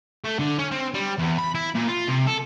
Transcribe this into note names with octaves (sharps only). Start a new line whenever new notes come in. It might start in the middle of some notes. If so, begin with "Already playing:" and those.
A3
D3
C#4
C4
G3
E2
B5
E4
A#2
F4
C3
A4